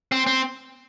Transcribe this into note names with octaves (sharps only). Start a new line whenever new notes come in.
C4
C4